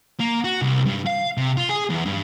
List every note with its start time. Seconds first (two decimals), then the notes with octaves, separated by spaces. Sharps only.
0.19 A#3
0.45 F#4
0.62 C2
0.86 G2
1.06 F5
1.37 C3
1.57 F4
1.69 G#4
1.90 E2
2.05 G2